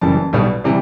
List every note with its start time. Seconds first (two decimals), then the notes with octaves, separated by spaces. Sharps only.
0.01 F#1 F#2 E3 G3 A5
0.33 B1 B2 G3
0.64 C3 E3 G3